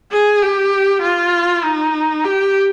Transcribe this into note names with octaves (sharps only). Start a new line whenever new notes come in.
G#4
G4
F4
D#4
G4